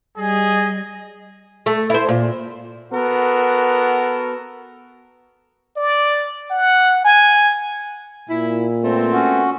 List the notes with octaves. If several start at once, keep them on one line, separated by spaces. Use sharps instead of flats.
G3 G#4 D#5
A3
E4 C5
A#2
B3 F#4 A4 A#4
D5
F#5
G#5
A#2 E4
A3 B3 C4
C#4 F#4